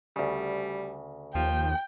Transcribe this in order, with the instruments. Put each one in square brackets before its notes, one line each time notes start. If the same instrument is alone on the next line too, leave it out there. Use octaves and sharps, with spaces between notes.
[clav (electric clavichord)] D2 C#3 [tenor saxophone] G3
[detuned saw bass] D#2 [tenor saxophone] F3 [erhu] G5